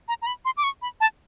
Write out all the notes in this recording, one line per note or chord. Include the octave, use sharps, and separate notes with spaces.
A#5
A#5
B5
C6
D6
C#6
B5
A5